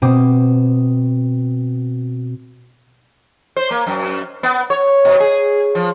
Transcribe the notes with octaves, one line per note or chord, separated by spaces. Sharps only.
B2 C4 D6 D#6 D#7
C5
A#3
F#2
B3
C#5
B2
G#4
F3